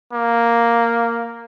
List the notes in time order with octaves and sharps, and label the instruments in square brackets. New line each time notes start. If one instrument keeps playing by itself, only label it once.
[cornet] A#3